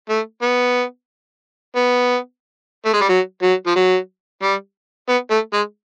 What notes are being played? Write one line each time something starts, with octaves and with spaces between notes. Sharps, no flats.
A3
B3
B3
A3
G#3
G3
F#3
F#3
F3
F#3
G3
B3
A3
G#3